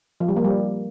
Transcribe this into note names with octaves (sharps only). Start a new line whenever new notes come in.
F3
G3
A#3
G3